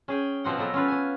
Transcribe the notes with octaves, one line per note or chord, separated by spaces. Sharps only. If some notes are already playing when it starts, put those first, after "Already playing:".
C#4 G#4 G5
B2 F3 C4 F#5
F#3 B3 A4 A#5
C#4 F4 B4
C#4 G#5